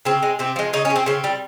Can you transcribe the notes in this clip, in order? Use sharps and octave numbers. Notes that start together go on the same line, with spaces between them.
C#3 C4
G#3
C3 C4
F3 G#3
C#3 D#4
C#4
G#3
C4
C#3 C4
G3